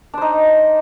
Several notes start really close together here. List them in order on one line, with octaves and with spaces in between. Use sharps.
D4 C5 D#4